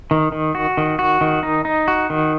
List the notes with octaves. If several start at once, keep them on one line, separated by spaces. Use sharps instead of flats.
D#3
D#3
F#4
D#3
F#4
D#3
D#4
D#4
F#4
D#3